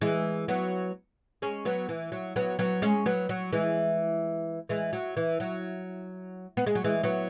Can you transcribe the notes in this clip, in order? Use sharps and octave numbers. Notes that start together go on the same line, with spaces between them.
E3 G#3
F#3 B3
G#3 C#4
F#3 B3
E3
F#3
F#3 B3
F#3 B3
G#3 C#4
F#3 B3
F#3
E3 G#3
E3 G#3
F#3
E3
F#3
B3
G#3
F#3
E3 G#3
F#3 B3